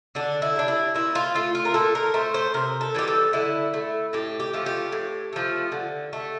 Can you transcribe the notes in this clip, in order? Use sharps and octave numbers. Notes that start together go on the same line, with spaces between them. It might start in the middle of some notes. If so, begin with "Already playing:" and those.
D3 D4
E4
G3 D4
E4
A#2 E4
F4
A3 F4
F4
A#4
A#2 A4
A#4
A3 C5
C5
C3 A#4
A4
E3 G3 G4
A4
D3 E4
A3
A2 G4
G4
F3 A3
G4
A2
F3 A3
D3
A3